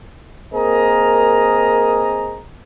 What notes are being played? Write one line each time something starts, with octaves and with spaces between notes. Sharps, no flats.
A#3 C4 G#4 A#4 D#5 A#5